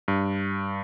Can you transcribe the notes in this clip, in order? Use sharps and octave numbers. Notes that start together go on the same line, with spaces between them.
G2